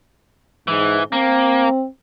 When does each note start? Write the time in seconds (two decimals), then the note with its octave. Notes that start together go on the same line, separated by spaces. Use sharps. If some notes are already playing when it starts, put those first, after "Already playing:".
0.68 G#2 E3
1.12 A#3 C4